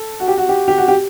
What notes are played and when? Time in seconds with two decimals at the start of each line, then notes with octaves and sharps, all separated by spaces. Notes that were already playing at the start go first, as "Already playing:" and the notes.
Already playing: A4
0.20 F#4
0.28 G4
0.38 F#4
0.49 G4
0.68 G4
0.78 F#4
0.88 G4